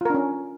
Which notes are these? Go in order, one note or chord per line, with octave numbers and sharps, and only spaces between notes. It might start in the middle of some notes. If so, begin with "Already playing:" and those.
C#4 D4 F4 A#4